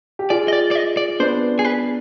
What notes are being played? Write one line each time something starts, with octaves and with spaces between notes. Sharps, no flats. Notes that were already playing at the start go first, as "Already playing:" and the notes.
G4
F4 G#4 D5
D#5
D5
D5
D#5
D5
B3 D4 C5
G#4
B4